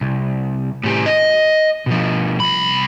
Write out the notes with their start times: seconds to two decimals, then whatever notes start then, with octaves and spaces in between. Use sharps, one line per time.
0.01 C2
0.84 A2 G4
1.06 D#5
1.86 B2 F3
2.40 C2 B5